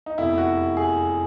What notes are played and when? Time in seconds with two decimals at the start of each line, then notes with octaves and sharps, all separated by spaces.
0.06 D#4
0.18 F1 E2 C3 E4
0.38 F#4
0.77 G#4